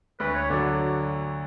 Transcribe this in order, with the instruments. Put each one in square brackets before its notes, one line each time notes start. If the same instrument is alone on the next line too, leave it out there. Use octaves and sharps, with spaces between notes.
[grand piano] D2 [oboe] B4
[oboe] C#5
[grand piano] D3 F#3 [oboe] D5